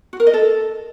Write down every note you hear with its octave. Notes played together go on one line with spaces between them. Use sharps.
F#4
A#4
D#5
A4